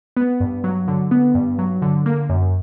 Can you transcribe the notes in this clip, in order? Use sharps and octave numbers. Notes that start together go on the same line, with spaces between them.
B3
G2
F#3
D3
B3
G2
F#3
D3
A#3
F#2